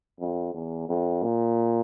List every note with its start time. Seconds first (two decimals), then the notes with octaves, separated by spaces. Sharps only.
0.20 F2
0.54 E2
0.89 F2
1.23 A#2